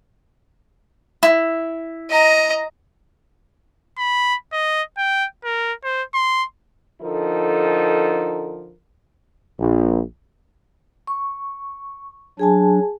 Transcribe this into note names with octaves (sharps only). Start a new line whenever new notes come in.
E4
D#5 A#5
B5
D#5
G5
A#4
C5
C6
D3 F3 D#4 A4 A#4
A#1
C#6
F#3 D4 G#4 G#5 A5